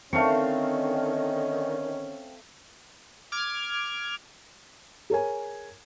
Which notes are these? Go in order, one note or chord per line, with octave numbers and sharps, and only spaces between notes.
D3 D#3 A3 C4 C#4 F5 C#6
D6 F6 G#6
G#4 A#4 C#5 G#5